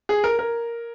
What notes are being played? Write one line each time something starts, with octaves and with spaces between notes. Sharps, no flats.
G#4
A#4
A#4